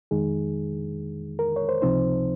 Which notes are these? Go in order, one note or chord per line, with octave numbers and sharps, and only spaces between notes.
F2 D#3 G#3 D#4 G#4
A#4
C#5
C5
C#2 C3 F3 C4 D#4 C5